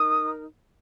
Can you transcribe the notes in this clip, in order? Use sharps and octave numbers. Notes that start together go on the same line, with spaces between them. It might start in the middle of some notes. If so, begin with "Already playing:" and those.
Already playing: D#4 A#4 D#6